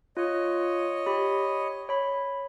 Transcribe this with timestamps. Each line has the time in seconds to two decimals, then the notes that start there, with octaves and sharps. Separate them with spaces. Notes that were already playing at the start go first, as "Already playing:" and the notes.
0.17 F4 C#5 D#5
1.06 G4 B5
1.89 C#5 B5